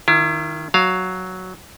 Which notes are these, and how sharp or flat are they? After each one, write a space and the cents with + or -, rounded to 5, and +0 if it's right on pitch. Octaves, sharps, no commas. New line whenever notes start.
D#3 +0 E4 +40
F#3 +0 F5 +0